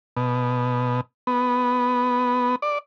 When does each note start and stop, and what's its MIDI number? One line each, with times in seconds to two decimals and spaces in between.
0.17 1.01 47
1.27 2.56 59
2.62 2.78 74